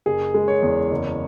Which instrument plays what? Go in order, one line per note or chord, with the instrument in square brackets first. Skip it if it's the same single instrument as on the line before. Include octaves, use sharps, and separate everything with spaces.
[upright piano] F#1 G#4
G#3
C#5
E2
F#1